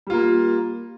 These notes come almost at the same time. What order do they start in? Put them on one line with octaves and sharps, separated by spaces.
G3 F4 A#3